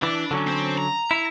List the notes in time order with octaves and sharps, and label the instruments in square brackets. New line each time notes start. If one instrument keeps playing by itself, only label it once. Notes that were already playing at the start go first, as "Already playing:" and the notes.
[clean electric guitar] E3 [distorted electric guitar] D4 D5
[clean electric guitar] D3 F#3 C#4
[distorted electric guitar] C4 C5
A#5
[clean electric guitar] E4